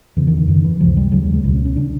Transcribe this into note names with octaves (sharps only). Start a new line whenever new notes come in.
E2 C#3 E3
D#3
D#3
F#2 D3 D#3
E3
C#2 C3 F3
G3
D#2 C#3 F#3
G3
G#3
C#2 B2 G3
C#4
C#4
C#3 D4